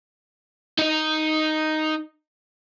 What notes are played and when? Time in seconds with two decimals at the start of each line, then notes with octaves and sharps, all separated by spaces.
0.79 D#4 D#5